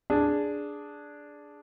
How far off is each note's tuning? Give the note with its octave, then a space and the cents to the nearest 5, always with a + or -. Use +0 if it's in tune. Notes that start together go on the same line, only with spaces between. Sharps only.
D4 -5 G#4 +0 G#5 +0